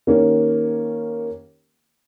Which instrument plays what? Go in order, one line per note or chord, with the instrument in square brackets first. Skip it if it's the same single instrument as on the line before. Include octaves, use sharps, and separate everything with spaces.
[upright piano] D#3 A#3 C#4 G4